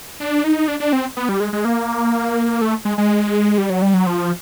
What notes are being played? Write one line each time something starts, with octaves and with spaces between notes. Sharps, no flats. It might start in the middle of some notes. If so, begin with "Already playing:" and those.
D4
D#4
D4
D4
C4
B3
G3
G#3
G#3
A#3
A3
G#3
G#3
G3
F#3
G3
F#3
F3